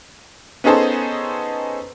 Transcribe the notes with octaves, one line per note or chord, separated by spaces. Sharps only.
B3 C#4 D#4 G#4 A4 C5